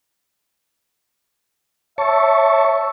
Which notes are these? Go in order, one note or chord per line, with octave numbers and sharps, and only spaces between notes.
C#5 E5 A5 C#6